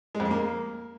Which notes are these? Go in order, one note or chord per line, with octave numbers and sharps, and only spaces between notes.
G#3
F2
G#3
A#3